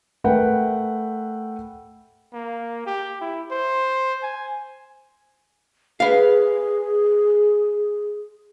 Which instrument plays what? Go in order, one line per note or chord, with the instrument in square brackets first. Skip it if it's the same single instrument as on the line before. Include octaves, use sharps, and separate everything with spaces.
[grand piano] A3 A#4 B4 F#5 G5
[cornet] A#3
G4
E4
C5
G#5
[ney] G#4 [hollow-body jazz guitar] B4 F5